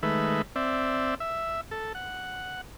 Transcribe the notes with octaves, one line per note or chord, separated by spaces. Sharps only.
D#3 G#3 A3 B4 E5
C4 D5 E5
E5
A4
F#5